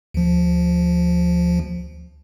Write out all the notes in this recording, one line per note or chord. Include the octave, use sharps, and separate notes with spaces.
D2 F3